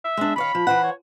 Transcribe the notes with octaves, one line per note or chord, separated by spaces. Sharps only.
E5
G#3 D4
D#3 C#5 F5 B5
F3
E3 C5 F#5
C#5